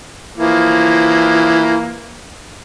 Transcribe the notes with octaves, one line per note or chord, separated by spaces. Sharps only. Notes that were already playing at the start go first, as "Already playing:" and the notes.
E3 F3 A#3